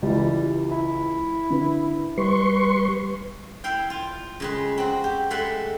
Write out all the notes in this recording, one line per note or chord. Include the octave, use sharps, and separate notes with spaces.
C#2 E3 G3
E4
D3 B4
G3 B4 C6 C#6
E4 F5 G5
F4
C#3 G#3 B4
C4 F#4
G4
G#3 A3 B4 E5 F#5